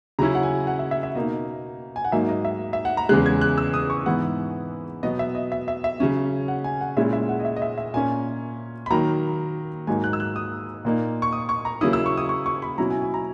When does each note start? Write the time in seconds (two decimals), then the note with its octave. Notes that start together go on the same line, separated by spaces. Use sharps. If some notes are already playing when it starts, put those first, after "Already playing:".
0.19 C#3 F#3 C#4 E4 A#5
0.35 F#5
0.43 G#5
0.67 F#5
0.79 E5
0.91 E5
1.03 E5
1.15 B2 A#3 D#4 D#5
1.96 G#5
2.05 F#5
2.12 G#2 F#3 A#3 D#4 E5
2.29 D#5
2.45 E5
2.73 E5
2.85 F#5
2.97 A#5
3.09 E2 C#3 G#3 F#6
3.26 G#6
3.41 F#6
3.58 E6
3.74 D#6
3.90 C#6
4.06 G#2 E3 B3 E4 F#5
5.03 B2 F#3 B3 D#5
5.19 E5
5.35 D#5
5.52 E5
5.68 E5
5.84 E5
6.00 C#3 F#3 C#4
6.48 F#5
6.64 G#5
6.81 F#5
6.97 A#2 G#3 C#4 E4 E5
7.13 E5
7.29 F#5
7.40 D#5
7.45 E5
7.56 D#5
7.62 E5
7.78 E5
7.94 A#2 A#3 C#4 G#5
8.86 B5
8.90 D#3 F#3 A#3 A#5
9.87 G#2 F#3 A#3 D#4 G#5
10.04 F#6
10.13 E6
10.20 F#6
10.36 D#6
10.85 A#2 A#3 D#4
11.22 C#6
11.33 D#6
11.49 C#6
11.65 A#5
11.81 C#3 F#3 A#3 C#4 E4 D#6
11.93 E6
12.06 C#6
12.17 D#6
12.29 C#6
12.46 C#6
12.62 B5
12.78 B2 F#3 C#4 E4 A#5
12.90 G#5
13.02 G#5
13.14 A#5